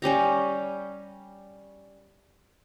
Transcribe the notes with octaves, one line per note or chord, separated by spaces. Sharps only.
G3 C#4 G4 A#5